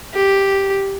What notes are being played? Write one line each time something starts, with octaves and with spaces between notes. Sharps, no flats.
G4